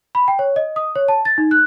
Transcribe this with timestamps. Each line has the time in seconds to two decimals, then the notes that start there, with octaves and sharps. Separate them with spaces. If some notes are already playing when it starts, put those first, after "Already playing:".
0.15 B5
0.28 G5
0.39 C#5
0.56 D#5
0.76 D#6
0.95 C#5
1.08 A5
1.25 A6
1.38 D#4
1.51 F#6